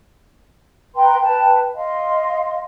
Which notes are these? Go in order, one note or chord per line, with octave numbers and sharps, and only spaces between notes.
B4 G5 A#5 C6
B4 G5 A5
D#5 F5 C6